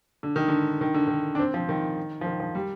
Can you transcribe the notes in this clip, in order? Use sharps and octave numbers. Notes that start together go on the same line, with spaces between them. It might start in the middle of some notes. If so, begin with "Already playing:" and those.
D3
D#3
D3
D#3
D3
D#3
D4
C4
F3
D#3
F3
D#3
F3
G3